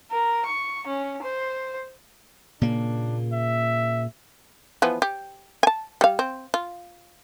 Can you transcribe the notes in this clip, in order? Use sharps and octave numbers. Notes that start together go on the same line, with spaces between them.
A#4
C#6
C#4
C5
A#2 C#3 A#3 D4
E5
E3 F3 B3
G4
G#5 A5
G3 F5
C4
F4